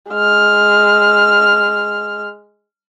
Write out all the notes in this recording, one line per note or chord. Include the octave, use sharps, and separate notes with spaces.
G#3 F6